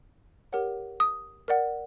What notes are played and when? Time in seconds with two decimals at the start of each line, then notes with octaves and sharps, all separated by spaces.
0.53 G4 A#4 C#5 F#5
1.00 D#6
1.48 A#4 D5 F#5